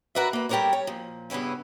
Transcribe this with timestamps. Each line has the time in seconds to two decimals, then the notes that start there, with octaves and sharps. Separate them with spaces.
0.15 F#4 A#4 B4 D5 E5
0.33 A#3 B4
0.49 G3 G4 A4 A#4 C#5 D5
0.73 C#5
0.87 A#2 F3
1.30 G2 C#3 B3 C#4 E4